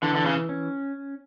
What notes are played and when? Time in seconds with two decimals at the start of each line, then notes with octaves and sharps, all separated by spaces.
0.03 D3 E3
0.15 D3
0.26 C#3
0.49 C#4